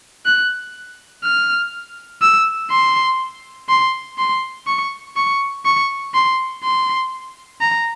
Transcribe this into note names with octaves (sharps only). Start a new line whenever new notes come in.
F#6
F6
E6
C6
C6
C6
C#6
C#6
C#6
C6
C6
A#5